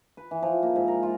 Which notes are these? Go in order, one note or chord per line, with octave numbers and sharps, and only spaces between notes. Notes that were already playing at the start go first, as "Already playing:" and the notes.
B4
E3
F3
A#3
G#2
A#4
F4